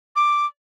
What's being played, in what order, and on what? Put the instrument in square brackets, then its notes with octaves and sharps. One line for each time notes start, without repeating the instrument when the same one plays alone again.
[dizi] D6